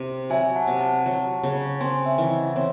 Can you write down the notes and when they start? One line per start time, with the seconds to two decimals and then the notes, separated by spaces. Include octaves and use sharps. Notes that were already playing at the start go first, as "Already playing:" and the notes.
Already playing: C3
0.30 F#3 E5 G#5
0.56 F#5 A5
0.67 C3
0.81 F#5 A5
1.06 F#3
1.43 C#3
1.80 C4 G#5 C6
2.05 E5 G#5
2.18 E3 E5
2.30 D#5 F#5
2.55 C4 C#5 E5